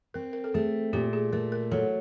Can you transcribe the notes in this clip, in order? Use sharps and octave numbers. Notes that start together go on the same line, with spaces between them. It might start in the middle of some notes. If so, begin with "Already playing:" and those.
C4 A#4
A#4
A4
A3 G#4
A#2 G4
G#4
A3 A#4
A#4
F#3 A4